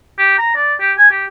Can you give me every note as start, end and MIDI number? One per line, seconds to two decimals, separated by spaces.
0.19 0.37 67
0.39 0.52 82
0.56 0.74 74
0.80 0.92 67
0.98 1.10 80
1.11 1.25 67